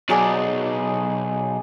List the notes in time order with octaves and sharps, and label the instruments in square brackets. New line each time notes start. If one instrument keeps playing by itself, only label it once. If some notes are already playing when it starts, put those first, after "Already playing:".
[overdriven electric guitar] B1 [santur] F#3 G#4 D5